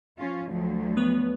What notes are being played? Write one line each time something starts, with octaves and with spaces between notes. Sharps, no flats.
F3 C#4 F4
D2 F3 F#3
B3 B4 C#5